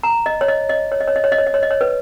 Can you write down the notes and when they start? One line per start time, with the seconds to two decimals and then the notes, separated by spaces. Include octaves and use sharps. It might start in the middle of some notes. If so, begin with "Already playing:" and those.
0.03 A#5
0.26 D#5
0.41 C#5
0.48 D#5
0.69 D#5
0.92 C#5
1.01 D#5
1.08 C#5
1.16 D#5
1.24 C#5
1.32 D#5
1.38 C#5
1.47 D#5
1.54 C#5
1.63 D#5
1.71 C#5
1.81 B4